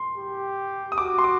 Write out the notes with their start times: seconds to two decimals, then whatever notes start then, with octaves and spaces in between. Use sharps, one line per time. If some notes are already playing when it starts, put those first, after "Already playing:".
Already playing: C6
0.18 G4
0.92 D#6
0.98 F#4 D6
1.18 C6
1.24 D6